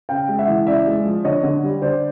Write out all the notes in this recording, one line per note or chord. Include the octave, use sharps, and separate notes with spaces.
C#3 F5 G5
G#3
E5 F#5
E3
C#3 D5 E5
G#3
F3
D3 C#5 D#5
D3
G3
D3 C5 D5